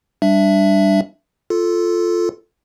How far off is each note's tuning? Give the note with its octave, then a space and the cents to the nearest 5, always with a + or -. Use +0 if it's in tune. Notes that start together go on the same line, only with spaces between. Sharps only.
G3 +0 D4 +0 E5 +15
F4 +0 A4 +0